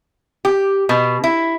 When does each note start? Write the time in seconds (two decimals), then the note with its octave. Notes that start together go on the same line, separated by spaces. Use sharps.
0.45 G4
0.89 B2
1.24 E4